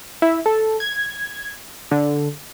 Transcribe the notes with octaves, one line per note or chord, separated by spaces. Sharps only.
E4
A4
G#6
D3